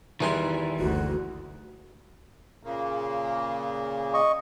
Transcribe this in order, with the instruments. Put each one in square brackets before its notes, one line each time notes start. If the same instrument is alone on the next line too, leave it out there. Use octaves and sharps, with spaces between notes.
[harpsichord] E2 G#4 C6 [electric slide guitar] D#3 E3 G3
[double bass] F#1 D2 [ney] F#4
[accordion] A#2 C#3 A#3
[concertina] D#5 C#6